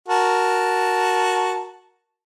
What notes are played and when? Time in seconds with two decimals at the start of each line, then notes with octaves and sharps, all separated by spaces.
0.09 F#4 A#4 A5